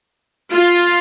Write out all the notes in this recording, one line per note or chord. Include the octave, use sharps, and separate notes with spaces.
F4